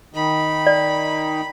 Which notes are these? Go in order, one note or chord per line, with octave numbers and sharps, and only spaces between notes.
D#3 D#4 B5
D5